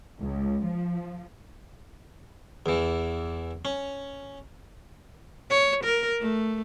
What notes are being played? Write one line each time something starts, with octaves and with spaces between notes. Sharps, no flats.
C#2
F3
E2 E3
C#4
C#5
A#4
A3